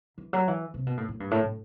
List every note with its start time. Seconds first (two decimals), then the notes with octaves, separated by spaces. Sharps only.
0.18 E3
0.33 F#3
0.48 E3
0.74 C3
0.86 B2
0.97 A2
1.09 A2
1.20 G2
1.31 A2
1.43 A2